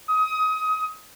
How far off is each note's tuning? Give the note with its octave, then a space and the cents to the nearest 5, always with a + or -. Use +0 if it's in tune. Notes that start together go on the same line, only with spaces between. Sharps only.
D#6 +25